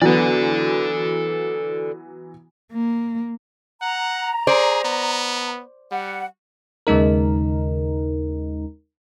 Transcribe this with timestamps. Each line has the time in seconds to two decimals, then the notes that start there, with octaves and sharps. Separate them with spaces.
0.02 E3 F#3 B3 A4 D5
2.73 A#3
3.81 F#5 A#5
4.47 G#4 C5 D5
4.84 B3
5.91 G3 F#5
6.87 D#2 C#3 G#3 D#4 A#4